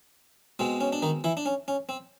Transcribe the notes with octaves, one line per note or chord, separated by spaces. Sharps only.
B2 G#3 C4
C#4
D4
D#3 D#4
E3 E4
D4
C#4
C#4
C4